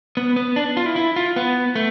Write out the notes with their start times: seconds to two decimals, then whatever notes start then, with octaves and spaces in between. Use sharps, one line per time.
0.17 B3
0.36 B3
0.56 D4
0.77 F4
0.86 E4
0.96 E4
1.16 F4
1.36 B3
1.75 A3